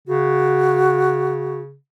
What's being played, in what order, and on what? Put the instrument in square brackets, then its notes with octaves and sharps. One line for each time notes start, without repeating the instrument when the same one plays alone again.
[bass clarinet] C#3 [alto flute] F#4